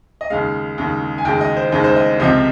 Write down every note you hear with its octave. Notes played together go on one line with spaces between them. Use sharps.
D#5
D#2 C#3 G#3 F5
D#2 C#3 G#3
G#5
D#2 C#3 G#3 G5
D#5
C5
D#2 C#3 G#3
C5
D#5
C#2 C3 F3 C4 D#5